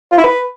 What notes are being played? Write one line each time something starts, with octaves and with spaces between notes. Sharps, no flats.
F4
E4
B4